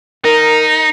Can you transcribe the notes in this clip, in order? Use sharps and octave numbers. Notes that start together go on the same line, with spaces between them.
D#4 A#4